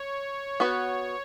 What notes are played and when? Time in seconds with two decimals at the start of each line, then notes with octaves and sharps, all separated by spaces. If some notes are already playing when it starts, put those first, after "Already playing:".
Already playing: C#5
0.60 B3 F#4 B4